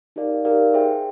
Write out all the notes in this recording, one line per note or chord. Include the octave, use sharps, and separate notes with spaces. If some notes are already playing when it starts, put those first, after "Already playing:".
D#4 G4 A#4 D5 F5
D#4 G4 A#4 D5 F5
G#4 C5 E5 G5